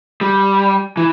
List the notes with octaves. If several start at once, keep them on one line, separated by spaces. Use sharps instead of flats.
G3
E3